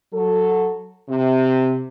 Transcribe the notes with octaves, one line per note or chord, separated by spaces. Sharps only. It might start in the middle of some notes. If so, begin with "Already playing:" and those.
F#3 A4
C3